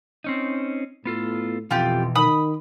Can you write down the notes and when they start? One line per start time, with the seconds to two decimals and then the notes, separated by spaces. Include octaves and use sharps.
0.24 C4 C#4 D#4
1.05 A2 B3 F4 A4
1.71 F2 B2 E3 F4 G4
2.15 D#3 B5 D#6